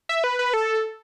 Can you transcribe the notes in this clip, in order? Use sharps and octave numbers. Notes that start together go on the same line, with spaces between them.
E5
B4
B4
A4